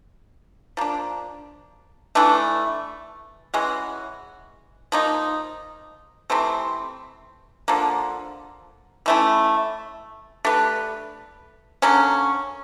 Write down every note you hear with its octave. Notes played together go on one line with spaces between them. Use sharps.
F3 A#3 D4
E3 A3 D4
E3 G#3 C#4 F#4
F3 A#3 D#4
C3 E3 A3 C4
D3 F3 A#3
E3 A3 C#4 E4
A3 D4 G4 B4
D3 F#3 A#3 C#4